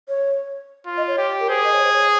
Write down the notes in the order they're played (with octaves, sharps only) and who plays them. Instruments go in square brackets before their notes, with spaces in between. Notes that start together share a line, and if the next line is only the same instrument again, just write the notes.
[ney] C#5
[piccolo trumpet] F4
[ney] D#5
C#5
[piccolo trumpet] G4
[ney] A#4
[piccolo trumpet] G#4 [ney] C5
[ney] D#5
C#5
C5
C#5